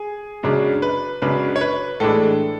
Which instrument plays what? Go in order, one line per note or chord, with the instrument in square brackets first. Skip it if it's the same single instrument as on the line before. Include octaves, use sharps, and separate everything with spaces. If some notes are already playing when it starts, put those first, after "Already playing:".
Already playing: [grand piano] G#4
F#2 C#3 G#3 D4
B4
F#2 C#3 G#3 D4 B4
C#5
B4
A2 E3 G#3 D4 A4